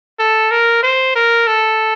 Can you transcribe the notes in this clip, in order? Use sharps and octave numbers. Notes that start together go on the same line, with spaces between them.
A4
A#4
C5
A#4
A4